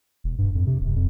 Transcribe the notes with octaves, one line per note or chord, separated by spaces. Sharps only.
E1
G2
F2
C3
D1
F2